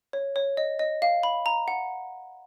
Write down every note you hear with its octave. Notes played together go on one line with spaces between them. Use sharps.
C#5
C#5
D#5
D#5
F5
B5
A#5
F#5